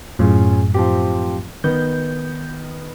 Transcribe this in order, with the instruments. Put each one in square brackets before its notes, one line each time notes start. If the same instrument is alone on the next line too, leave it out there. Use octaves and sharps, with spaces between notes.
[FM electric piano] F#2 A2 [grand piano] C#4 F4 G#4
[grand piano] F3 C4 G4
[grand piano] D#3 B3 [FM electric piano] G6